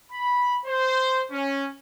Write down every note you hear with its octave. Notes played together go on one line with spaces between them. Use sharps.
B5
C5
C#4